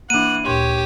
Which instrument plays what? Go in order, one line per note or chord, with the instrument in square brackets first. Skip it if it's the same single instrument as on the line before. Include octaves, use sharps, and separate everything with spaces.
[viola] E3 F#5 [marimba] A#3 D4 [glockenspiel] D#7
[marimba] D2 A#2 C6 [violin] G4 [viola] C#5